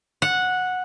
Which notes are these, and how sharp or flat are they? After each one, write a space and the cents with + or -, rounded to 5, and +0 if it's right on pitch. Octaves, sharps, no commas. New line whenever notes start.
F#5 -10